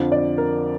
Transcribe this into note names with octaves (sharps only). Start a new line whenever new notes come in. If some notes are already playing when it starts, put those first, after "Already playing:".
Already playing: F2 D3 F3
D5
A#4